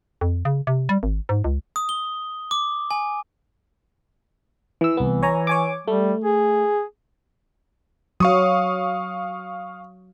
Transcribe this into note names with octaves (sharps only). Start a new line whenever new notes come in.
F2
C#3
C3
G3
G#1
G#2
C#2
D#6
G7
D6
G#5
E3 E6
C2 E3 B3
C#5 G#5 A#5
C#5 G#5 D6
G3 A3
G#4
F#3 F5 C#6 D#6